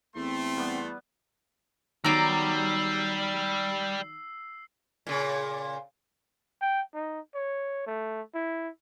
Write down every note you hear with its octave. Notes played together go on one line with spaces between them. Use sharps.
E2 A3 C4 C6
G3 B3 D5
D#3 F#3 G3 B3 A#5 D6 E6 C7
A#2 C#3
G5
D#4
C#5
A3
E4